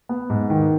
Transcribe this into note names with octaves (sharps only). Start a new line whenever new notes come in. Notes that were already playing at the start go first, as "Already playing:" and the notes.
B3
G#2
D#3